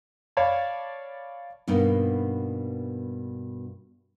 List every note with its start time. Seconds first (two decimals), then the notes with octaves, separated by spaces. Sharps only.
0.37 C#5 D5 F5 A5 B5
1.68 G2 B2 A#3 B3 D#4